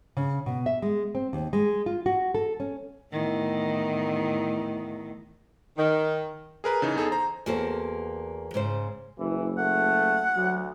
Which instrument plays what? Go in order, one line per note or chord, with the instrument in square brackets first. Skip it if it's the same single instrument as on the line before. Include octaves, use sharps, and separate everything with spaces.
[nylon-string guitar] C#3
B2
E5
G#3
C4
D#2
G#3
F4
F#4
A4
C#4
[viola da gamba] E2 A2 D#3
[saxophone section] D#3
[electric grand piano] G#4 A#4 B4 A#5
C#3 E3 D#4
E2 D#4 G#4 A4
C5 A#5
[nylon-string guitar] E2 A#3 F#4 A4 C5
G#2 C#3 C5
[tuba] F#1 [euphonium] E3
[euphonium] A3 [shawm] F#5
[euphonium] D2 [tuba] F#3